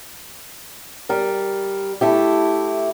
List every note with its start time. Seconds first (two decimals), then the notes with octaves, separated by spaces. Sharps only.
1.09 G3 A#4
2.01 A3 E4 G4